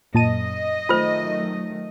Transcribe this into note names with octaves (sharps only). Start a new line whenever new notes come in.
F#2 A#2 D#5 A5 D#7
D#3 F#3 A3 F4 C5